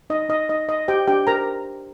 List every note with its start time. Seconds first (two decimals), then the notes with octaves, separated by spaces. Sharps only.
0.10 D#4 D#5
0.29 D#4 D#5
0.49 D#4 D#5
0.69 D#4 D#5
0.88 G4 C5 G5
1.07 D4 G4 G5
1.27 A#4 C5 A#5